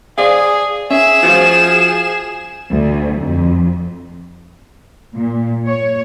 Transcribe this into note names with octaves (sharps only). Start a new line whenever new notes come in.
G#4 C5 D5 F5
C#4 G#4 E5 E7
F3 F4 F#4 C5
D2
F2
A#2
C#5